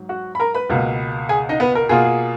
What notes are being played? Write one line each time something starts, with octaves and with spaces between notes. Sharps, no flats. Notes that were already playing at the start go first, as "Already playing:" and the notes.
Already playing: G#2 F#3
F#4 F#5
B5
A#4 A#5
B4 B5
C#2 B2 A#3
G#4 G#5
D#4 D#5
B3 B4
A#4
B2 A#3 F4 G#4
G#4